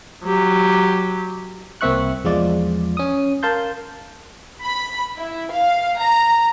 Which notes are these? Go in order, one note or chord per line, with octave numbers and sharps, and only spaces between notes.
F#3 G4
C2 A#3 C4 E5 C#6 F#6
E2 F3 G#3 F4 D5
C#4 D#6
A#4 F5 A5 C6 G6
B5
E4
F5
A#5